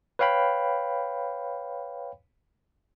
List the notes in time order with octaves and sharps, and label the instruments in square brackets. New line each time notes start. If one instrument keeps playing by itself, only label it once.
[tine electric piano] B4 C#5 F5 G5 B5